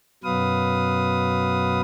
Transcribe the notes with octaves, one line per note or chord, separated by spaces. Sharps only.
F#2 B2 F#3 B4 F5 D#6